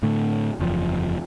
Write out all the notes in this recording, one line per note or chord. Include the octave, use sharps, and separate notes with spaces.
A2 D3 A3
F#1 E2 F3